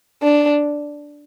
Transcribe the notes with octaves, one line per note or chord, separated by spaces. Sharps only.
D4